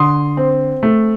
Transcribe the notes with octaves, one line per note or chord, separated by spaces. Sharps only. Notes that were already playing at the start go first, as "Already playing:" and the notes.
Already playing: D3 C6 D#6
C4
A3